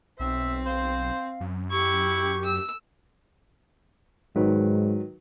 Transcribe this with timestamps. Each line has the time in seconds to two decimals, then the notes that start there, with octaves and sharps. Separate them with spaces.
0.20 B1 C4 E5
0.66 C5 F5
1.40 F#2
1.71 E4 G4 C#6
2.45 E6
4.36 G#2 D#3 F#3 B4